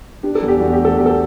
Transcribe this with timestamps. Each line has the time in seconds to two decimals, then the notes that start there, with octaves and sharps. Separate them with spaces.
0.23 D4 G4
0.35 A4
0.42 E2
0.48 G4
0.60 E2 F#4
0.73 G4
0.79 A3
0.85 A4
0.97 E2 G4
1.06 A4